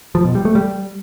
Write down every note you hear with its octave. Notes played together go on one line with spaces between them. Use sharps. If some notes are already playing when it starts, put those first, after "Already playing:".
F3
B2
G3
A3
G3